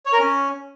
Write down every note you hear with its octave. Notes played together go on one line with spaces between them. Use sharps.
C#5
A#4
C#4